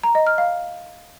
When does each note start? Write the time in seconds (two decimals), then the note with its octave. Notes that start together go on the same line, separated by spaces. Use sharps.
0.03 A#5
0.15 D#5
0.27 F6
0.38 F5